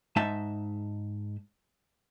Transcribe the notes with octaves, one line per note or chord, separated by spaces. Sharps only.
G#2 G#3 D#4 D#5 E5 A5